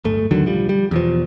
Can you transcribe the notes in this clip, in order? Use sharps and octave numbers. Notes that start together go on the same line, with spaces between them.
D1 G1 A3
D#2 D3 D#3 F#3
B1 F3 G3
G3
E2 B2 F3